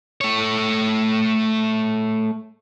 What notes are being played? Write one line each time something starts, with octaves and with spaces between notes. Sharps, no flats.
A3 C#5